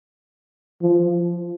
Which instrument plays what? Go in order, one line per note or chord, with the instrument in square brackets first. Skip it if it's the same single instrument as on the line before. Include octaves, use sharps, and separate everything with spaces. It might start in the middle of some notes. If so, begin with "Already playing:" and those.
[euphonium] F3